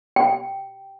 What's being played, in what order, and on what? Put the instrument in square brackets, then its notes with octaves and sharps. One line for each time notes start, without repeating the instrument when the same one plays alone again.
[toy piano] G5